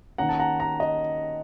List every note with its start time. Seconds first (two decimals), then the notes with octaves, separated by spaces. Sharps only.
0.18 D#3 A#3 C#4 F#5 A#5
0.29 A5
0.39 F#5 A#5
0.60 F#5 A#5
0.80 D#5